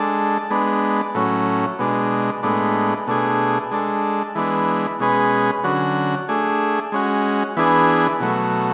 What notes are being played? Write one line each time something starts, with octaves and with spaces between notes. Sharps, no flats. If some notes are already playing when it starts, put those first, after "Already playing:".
Already playing: G#3 D4 A4
G#3 B3 D4
A2 F#3 C#4
B2 G#3 D4
A2 G#3 B3 D4
B2 A3 D4 G#4
G#3 D4 A4
E3 G#3 B3 D4
B2 G#3 C#4 G#4 B4
D3 F#3 C#4 F#4
A3 D4 G#4
G#3 C#4 F#4
E3 B3 D4 G#4
B2 F#3 A3